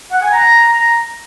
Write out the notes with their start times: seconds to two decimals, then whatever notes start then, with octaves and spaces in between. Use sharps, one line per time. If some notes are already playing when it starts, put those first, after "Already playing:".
0.12 F#5
0.22 G#5
0.32 A#5